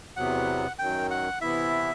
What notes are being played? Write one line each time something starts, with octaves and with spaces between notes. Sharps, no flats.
E2 C3 F#3 B3 F#5
F#2 D#3 F#3 G5
F#5
C3 E3 B3 E4 E5